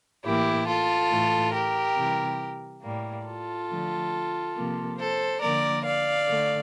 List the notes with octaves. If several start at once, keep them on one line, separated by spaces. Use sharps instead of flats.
A2 E3 A#3 E4 G4
F4 A4
A2 E3 A3
G4 A#4
C3 E3 G3
A2 G3 A#3
F4 A4
D3 F3 A3
C3 F3 A#3
A4 C5
D3 F3 A#3 A#4 D5
D5 F5
D3 A3